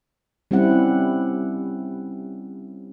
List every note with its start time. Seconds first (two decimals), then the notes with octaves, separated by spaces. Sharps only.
0.51 G3 C4 C#4 E4 F#5